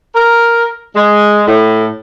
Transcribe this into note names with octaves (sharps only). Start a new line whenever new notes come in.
A#4
G#3
A2